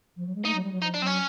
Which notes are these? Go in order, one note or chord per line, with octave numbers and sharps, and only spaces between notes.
F3
F#3
G#3
A3 D#4
F#3
G3
F#3
F3 D#4
D4
F#3 C4
C#4